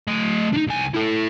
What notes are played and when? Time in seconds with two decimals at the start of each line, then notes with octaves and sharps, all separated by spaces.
0.08 A3 D#5
0.54 D4 D#4
0.68 C2 G#5
0.94 E4 A4